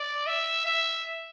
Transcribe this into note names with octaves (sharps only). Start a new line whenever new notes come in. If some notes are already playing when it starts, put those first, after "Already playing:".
Already playing: D5
E5
E5